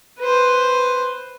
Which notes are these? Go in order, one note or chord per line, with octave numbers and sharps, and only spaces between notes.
B4 C5